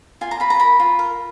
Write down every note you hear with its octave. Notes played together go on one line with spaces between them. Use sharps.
F4 G#5
A#5
F4 B5
A#5
A#4 B5
F4
A#4